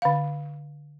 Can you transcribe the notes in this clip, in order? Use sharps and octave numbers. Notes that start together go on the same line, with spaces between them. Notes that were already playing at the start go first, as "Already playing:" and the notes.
D3 F5